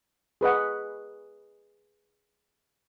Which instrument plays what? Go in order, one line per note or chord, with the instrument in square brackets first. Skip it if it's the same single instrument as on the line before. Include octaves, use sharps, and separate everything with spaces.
[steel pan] G#4 B4 D#5 F#5